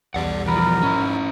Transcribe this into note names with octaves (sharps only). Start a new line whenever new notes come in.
B1 E2 G3 D5 F#5
E3 F3 A#4 B5
G#2 C#4 E4 B5